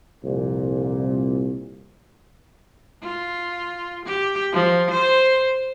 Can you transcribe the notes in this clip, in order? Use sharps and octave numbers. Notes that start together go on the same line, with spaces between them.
C2 F2 A#2
F4
G4
F3
C5